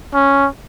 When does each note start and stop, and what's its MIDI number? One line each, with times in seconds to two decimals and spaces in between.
0.14 0.48 61